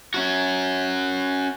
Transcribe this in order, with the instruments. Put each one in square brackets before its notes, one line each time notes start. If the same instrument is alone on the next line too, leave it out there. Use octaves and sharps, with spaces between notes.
[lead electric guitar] C#4 F#4